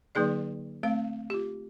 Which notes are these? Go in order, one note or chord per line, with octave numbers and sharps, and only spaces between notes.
D3 F#3 A#3 D#4 G#4 D5
A3 C4 F5
F4 G4